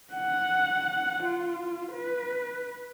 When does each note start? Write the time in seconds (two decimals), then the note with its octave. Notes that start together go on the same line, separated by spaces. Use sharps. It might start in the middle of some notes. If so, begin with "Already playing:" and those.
0.14 F#5
1.24 F4
1.93 B4